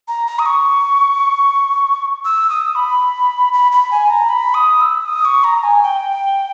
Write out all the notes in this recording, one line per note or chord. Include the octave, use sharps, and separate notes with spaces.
A#5
A#5
D#6
C#6
E6
D#6
B5
B5
B5
G#5
A#5
B5
D#6
E6
D#6
C#6
A#5
G#5
G5